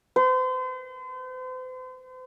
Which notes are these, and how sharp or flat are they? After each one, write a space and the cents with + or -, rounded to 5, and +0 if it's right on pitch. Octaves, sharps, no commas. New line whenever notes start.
C5 -40